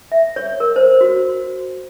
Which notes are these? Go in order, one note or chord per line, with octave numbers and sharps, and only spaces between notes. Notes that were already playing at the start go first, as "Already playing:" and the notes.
E5
C#5
A#4
C5
F#4